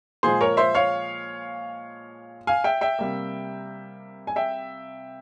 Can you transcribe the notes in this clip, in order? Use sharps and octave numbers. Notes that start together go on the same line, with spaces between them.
A#2 F3 G#3 G#4 C5
A#4 C#5
C5 E5
C#5 F5
F5 G#5
E5 G5
E5 G5
C3 G3 A#3
G#5
E5 G5